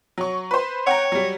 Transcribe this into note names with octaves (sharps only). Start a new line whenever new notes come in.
F#3 C#6
B4 C5
C#5 F#5 G5 A#5
F#3 G3